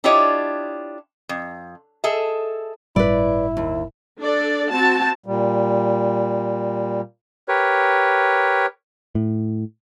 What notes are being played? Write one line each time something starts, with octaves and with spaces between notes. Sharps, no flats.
D4 E4 F4 G4 C#5 D#5
F2
G#4 A4 D#5 E5
G1 A2 G3 E4 B4 D5
D#2
D4 A4 D5
C4 F#4 A5
A#2 G3
G4 A#4 B4 C#5
A2